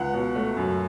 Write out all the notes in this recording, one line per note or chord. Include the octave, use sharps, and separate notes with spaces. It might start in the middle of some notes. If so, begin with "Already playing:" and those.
Already playing: C#2 F#5
B2
A3
F#2